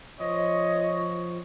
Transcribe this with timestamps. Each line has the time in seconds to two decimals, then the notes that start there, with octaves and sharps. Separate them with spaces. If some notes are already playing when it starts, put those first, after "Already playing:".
0.20 F3 C#5 D#5